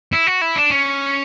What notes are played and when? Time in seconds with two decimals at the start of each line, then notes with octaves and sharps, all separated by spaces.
0.13 E4
0.27 F#4
0.41 E4
0.56 D4
0.70 C#4